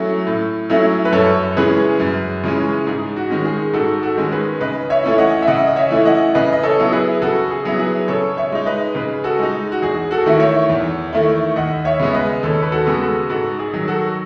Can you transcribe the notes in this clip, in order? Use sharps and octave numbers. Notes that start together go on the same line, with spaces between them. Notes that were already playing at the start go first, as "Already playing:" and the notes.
Already playing: F#3 A3 C#4 E4
A2
F#3 A3 C#4 E4
B4
F#2 A4 C#5
C#3 E3 G#3 C#4 G#4 B4
F#2
C#3 E3 G#3 C#4
G#2 G#4
F#4
D#3 G#3 C#4
G#4
G#2 F#4 A4
F#4 A4
D#3 G#3 C#4
G#4 B4
C#3 B4 D#5
C#5 E5
E3 A3 C#4 E4
D#5 F#5
E5
C#3 D#5 F#5
D#5
C#5 E5
E3 A3 C#4 E4
D#5 F#5
C#3 B4 D#5
D#5
A4 C#5
F#3 B3 E4
G#4 B4
C#3 F#4 A4
G#4
F#3 B3 E4
G#4 B4
C#3 A4 C#5
C#5 E5
G#3 D#4
B4 D#5
C#3 G#4 B4
F#4 A4
G#3 D#4
F#4
E2 G#4
F#4 A4
D#3 A3 E4
C#5 E5
E2
D#3 A3 E4
D#2 D#5 F#5
C#5 E5
C#3 G#3 B3
B4 D#5
D#2 A4 C#5
B4
F#4 A4
C#3 G#3 B3
F#4 A4
G#2 F#4 A4
G#4
D#3 F#3
F#4 A4